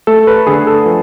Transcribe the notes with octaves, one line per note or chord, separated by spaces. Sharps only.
A3 A4
B4
D3 G#4
A4
F3 B4